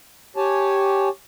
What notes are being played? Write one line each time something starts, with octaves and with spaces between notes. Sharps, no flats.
G4 C#5 G#5 A5